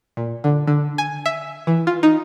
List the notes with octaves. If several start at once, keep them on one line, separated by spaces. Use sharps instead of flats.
A#2
D3
D3
G#5
E5
E3
F4
D#4